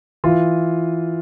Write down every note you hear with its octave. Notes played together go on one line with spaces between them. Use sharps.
E3 F4